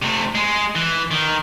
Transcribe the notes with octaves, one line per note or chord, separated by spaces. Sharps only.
C3 A3
G#3
E3
D#3